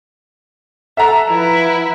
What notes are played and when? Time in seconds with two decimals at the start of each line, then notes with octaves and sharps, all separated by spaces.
0.97 A4 E5 F#5 A#5
1.27 F3 E4 B4